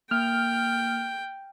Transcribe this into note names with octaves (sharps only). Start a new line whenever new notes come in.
A#3 G5 F6